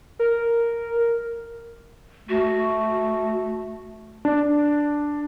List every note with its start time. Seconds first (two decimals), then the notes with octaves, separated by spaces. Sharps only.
0.19 A#4
2.29 A3 F#4
4.25 D4